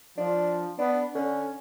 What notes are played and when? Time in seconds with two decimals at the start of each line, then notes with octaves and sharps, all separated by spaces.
0.18 F3 D4
0.79 B3 D4
1.15 D3 C#4